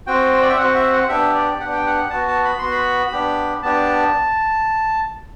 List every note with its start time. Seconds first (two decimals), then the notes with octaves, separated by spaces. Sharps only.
0.07 C4 F#4 G5
0.33 C5
0.42 D5
0.49 E5
0.58 C4 F#4 F#5
0.75 E5
0.92 F#5
1.08 B3 D4 G4 E5
1.35 D5
1.59 B3 D4 G4 F#5
1.72 G5
1.86 F#5
2.10 B3 F#4 A5
2.27 A5
2.45 B5
2.59 B3 F#4 C6
2.71 B5
3.12 B3 D4 G4
3.63 B3 D4 G4 A5